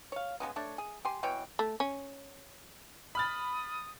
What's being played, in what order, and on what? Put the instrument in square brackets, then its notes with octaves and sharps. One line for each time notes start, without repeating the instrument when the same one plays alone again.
[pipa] C#5 F5
C#3 F#3 G#3 B3
A3 D4 C#5
G#4
G4 G#5 C6
B2 E3 C#5 G5
[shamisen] A3
C#4
[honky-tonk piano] B5 F6 A6 [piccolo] D#6